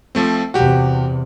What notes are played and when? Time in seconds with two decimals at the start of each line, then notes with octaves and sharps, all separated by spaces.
0.15 F3 A3 C4
0.54 E2 C3 F#4 G4